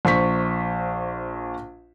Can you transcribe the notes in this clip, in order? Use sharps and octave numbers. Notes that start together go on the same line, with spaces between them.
A#1 C5 C#6 B6